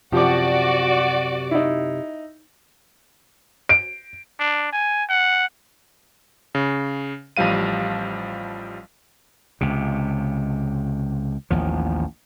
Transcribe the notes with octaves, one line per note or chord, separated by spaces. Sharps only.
F#2 C3 F3 F#4 G4 D5 D6
D#4 E4
D7
D4
G#5
F#5
C#3
A1 F3 G3 F5 D#7
C#2 C3
A1 D#2 F3